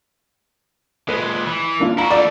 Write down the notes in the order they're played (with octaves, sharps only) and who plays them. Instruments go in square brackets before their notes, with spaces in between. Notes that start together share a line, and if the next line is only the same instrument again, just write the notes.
[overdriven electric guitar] A#2 G#3 [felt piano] B4
[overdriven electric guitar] E3
[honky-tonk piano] A#3 D4 F4
[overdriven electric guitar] E4 F#4 [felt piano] A#5
[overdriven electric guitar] E3 A3 [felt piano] D5